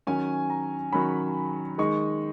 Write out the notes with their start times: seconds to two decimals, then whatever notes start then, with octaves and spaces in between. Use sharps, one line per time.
0.07 D#3 F#3 C#4 G#5
0.50 A#5
0.93 D#3 F#3 C#4 B5
1.78 D#3 G#3 D#4 C#6